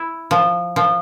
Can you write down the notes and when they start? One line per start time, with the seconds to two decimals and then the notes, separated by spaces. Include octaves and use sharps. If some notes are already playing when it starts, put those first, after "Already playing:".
Already playing: E4
0.31 F3
0.76 F3